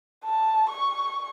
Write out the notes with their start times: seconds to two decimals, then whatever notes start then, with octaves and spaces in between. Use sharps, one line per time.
0.25 A5
0.69 C#6